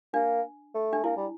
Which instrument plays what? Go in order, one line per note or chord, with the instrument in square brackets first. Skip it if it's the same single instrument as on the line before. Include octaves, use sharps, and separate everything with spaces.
[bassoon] A#3 [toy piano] D4
[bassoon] A3
[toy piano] D4
[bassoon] A#3 [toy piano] E4
[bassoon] G3